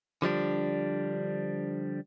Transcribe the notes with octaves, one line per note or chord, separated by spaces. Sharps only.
D3 F3 G3 D4